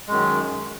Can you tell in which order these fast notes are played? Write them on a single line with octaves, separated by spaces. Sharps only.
G#3 F#2 D#3